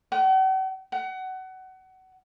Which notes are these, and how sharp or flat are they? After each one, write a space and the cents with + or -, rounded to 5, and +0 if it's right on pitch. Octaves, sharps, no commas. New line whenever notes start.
F#5 +45
F#5 +25